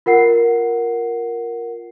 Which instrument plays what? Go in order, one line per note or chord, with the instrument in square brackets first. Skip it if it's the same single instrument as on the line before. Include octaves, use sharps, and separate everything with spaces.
[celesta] F4 A#4 F#5 C7